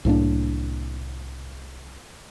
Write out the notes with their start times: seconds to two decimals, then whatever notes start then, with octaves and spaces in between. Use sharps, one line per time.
0.05 C2 A2 A#3 D4